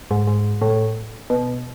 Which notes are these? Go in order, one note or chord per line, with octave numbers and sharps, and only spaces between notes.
G#2
G#2
A2
B2